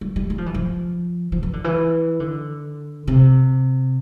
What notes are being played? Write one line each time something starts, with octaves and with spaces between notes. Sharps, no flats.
G3
G3
G3
F3
E3
F3
F3
E3
D3
E3
D3
C3